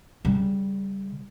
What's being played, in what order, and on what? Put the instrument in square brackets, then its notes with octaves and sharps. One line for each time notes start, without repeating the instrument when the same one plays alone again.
[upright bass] C#3 G3